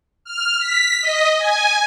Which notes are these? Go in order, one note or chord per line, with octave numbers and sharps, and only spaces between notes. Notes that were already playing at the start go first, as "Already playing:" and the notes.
F6
B6
D#5
G#5